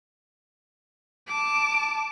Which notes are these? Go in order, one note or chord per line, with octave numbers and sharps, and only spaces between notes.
A5 D6